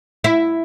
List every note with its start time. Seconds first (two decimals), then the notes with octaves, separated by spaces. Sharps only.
0.24 E4